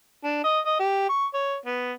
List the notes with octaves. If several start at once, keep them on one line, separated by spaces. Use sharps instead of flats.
D4
D#5
D#5
G4
C#6
C#5
B3